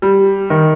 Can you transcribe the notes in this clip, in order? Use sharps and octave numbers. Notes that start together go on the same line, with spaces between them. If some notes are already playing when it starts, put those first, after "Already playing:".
G3
D#3